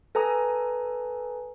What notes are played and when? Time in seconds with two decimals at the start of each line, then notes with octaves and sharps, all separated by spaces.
0.15 A4 B4 G#5 A#5 D#6